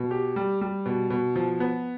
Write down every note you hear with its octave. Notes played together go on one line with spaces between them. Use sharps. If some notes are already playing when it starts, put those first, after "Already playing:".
Already playing: B2
G4
G3
G3
B2
B2
F3
B3